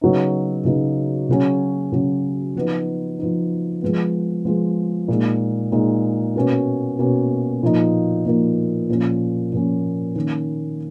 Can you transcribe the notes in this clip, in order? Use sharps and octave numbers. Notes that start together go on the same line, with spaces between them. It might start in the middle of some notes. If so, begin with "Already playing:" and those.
C#3 F#3 B3 D#4
C#3 F#3 B3 D#4
C#3 F#3 C#4
C#3 F#3 C#4
F3 B3 D#4
F3 B3 D#4
F3 G#3 B3
F3 G#3 B3
A#2 G#3 D#4
A#2 G#3 D#4
B2 A#3 C#4
B2 A#3 C#4
A#2 F3 A#3 D#4
A#2 F3 A#3 D#4
A#2 F3 A#3 C#4
A#2 F3 A#3 C#4
D#3 A#3 C#4